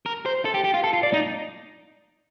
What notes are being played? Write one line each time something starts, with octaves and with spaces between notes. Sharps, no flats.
A#4
C5
A4
G4
G4
F4
A4
F4
D5
D#4